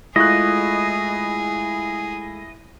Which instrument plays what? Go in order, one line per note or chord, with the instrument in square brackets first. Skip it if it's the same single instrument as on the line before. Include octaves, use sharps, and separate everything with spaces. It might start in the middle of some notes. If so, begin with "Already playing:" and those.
[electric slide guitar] G#3 A3 F4 [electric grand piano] E4 C#6 F#6 [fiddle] G#4 [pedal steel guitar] D#5